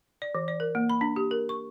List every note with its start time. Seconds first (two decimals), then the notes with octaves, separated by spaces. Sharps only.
0.22 D5
0.35 E3
0.48 D5
0.60 A#4
0.75 A#3
0.90 B5
1.01 D4
1.16 G4
1.31 A#4
1.49 C#6